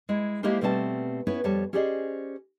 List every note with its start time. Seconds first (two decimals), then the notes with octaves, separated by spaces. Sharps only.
0.09 G#3 E4
0.43 G#3 A#3 E4 G4 A#4 C5
0.61 B2 G3 A3 C4 C#5 A5
1.27 B3 C#4 E4 B4 C#5
1.44 F2 G3 C#5 A5
1.73 C#4 G4 G#4 C5 D5 D#5